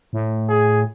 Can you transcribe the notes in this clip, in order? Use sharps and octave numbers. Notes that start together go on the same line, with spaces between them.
A2
G#4